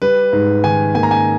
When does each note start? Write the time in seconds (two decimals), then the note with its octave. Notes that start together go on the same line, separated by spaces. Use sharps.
0.02 G3 B4
0.33 G#2
0.64 D#3 G#5
0.95 A#3 G#5
1.03 A#5
1.11 G#5